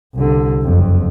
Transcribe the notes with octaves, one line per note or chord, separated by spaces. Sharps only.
C2 D3
F#1 F2